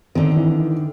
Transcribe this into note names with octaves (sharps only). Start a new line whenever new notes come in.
D3 D#3 C4
E3